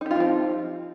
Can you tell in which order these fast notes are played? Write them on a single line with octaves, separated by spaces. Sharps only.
D#4 G4 F4 F3 C4